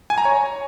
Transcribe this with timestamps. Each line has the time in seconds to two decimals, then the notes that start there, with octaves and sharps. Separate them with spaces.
0.10 G#5
0.18 A#5
0.25 C#5